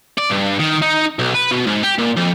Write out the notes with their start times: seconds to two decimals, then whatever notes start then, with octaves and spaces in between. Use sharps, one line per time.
0.18 D5
0.31 G2
0.60 D#3
0.82 D#4
1.19 B1
1.35 B4
1.51 B2
1.66 G#2
1.83 G4
1.98 A#2
2.17 F2